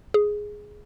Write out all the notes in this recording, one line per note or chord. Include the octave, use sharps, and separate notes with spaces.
G#4